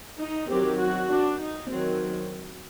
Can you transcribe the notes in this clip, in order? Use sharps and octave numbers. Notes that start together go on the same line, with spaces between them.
D#4
D#3 F#3 C4 G4
F#4
D4
D#4
D#3 F#3 C4